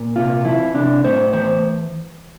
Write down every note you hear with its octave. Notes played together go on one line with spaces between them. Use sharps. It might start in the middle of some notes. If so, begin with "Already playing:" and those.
Already playing: A#2
C3 F4
F3 E4
C3 D4
A2 C5
E3 C5